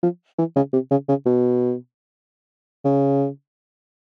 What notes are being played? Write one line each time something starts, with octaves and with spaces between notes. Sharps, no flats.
F3
E3
C#3
C3
C#3
C#3
B2
C#3